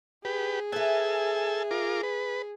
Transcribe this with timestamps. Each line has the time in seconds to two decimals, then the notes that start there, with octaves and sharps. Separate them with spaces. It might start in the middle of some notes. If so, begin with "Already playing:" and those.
0.25 G4 G#4 B4
0.72 A4 B4 E5 G#5 E6
1.71 F4 A#4 D6
2.03 B4